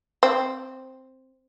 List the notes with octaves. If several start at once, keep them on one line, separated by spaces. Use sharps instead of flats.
C4